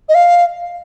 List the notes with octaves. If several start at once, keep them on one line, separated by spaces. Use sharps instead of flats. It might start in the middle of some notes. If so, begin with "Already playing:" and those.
D#5
F5